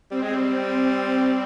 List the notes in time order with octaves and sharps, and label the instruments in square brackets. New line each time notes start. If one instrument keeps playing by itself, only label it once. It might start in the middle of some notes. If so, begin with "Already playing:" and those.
[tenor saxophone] G3 [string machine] C4
[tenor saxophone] G#3
G3
[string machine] C4